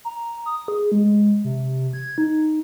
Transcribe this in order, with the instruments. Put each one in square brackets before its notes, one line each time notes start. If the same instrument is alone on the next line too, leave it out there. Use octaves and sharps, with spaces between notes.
[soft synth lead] A#5
D#6
G#4
G#3
C3
G#6
D#4